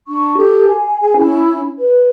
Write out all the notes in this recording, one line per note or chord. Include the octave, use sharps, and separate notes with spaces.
D4 C#6
G4 A4
G#5
G#4 G#5
C#4 E4
B4